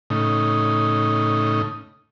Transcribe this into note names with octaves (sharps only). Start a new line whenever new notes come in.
A2 C#3 D#4